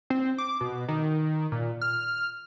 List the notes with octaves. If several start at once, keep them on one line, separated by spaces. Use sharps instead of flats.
C4
D6
B2
D#3
A#2
F6